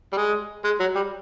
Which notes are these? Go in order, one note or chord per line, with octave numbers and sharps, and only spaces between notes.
G3
G#3
G#3
F#3
G3